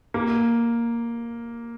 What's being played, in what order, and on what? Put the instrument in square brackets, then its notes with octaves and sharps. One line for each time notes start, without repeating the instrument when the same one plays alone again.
[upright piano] A#3